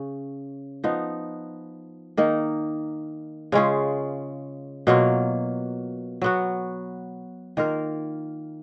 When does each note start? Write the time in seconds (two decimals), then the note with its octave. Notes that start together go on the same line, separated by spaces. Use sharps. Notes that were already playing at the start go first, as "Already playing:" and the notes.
Already playing: C#3 C#4
0.84 F3 B3 D#4
2.17 D#3 A#3 D#4
3.52 C#3 G#3 C#4 F4
4.87 B2 F#3 A#3 F4
6.22 F#3 B3 F#4
7.57 D#3 A#3 F4 A#4